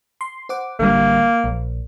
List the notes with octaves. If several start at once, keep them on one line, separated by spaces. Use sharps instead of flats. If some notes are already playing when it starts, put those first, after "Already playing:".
C6
C5 F#5 D6
A1 D3 G3 A#3
A#1